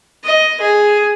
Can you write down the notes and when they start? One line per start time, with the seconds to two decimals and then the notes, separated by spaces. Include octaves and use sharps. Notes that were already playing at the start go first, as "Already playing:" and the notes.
0.24 D#5
0.60 G#4